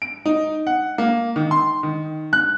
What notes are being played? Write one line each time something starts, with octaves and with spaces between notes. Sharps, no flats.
D7
D#4
F#5
A#3
D#3
C6
D#3
F#6